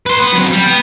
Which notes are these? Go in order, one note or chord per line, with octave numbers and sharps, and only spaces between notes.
B4 C6
B3
F#3 C4
G3
B3